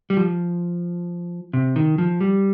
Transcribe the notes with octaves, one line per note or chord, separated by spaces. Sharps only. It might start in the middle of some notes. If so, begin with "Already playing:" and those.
G3
F3
C3
D#3
F3
G3